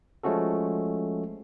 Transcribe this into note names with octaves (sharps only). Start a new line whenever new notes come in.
F3 G#3 A3 C#4 F#4 A4